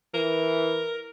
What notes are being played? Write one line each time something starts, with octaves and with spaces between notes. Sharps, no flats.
E3 A#4